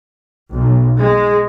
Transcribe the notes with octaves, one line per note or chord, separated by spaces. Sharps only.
B1
G#3